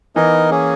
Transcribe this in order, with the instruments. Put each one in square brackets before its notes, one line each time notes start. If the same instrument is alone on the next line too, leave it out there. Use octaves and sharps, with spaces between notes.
[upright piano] E3 [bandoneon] B3 D#4 A#4 D#5
[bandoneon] A#3 C#4 G#4